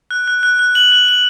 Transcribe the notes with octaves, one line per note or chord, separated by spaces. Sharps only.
F#6
F#6
F#6
F#6
F#7
F#6
F#7